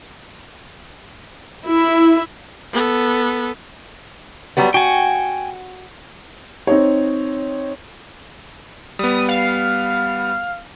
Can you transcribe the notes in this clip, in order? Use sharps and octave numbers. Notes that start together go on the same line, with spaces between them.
E4
B3 A4
F#3 G3 B3
F#4 G5 G#5
C4 D#4 C#5
G3 B3 D#6
F5